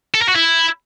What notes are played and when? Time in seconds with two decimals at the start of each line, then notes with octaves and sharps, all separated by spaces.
0.15 A4
0.22 A#4
0.29 F#4
0.36 E4